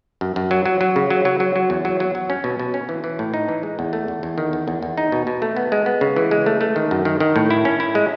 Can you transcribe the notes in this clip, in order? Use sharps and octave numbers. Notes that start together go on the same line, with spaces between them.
F#2
F#2
F#3
F#3
F#3
C#3
F#3
F#3
F#3
F#3
E2
F#3
F#3
F#3
C#4
B2
B2
C#4
E3
E3
A2
D#4
E3
G#3
E2
A3
E2
E2
D#3
E2
E2
E2
D#4
B2
B2
A3
B3
G#3
B3
C#3
E3
G#3
A3
A3
D#3
F#2
D#3
D#3
A2
E4
C#4
E4
G#3